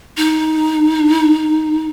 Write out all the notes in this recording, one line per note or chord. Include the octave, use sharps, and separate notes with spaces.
D#4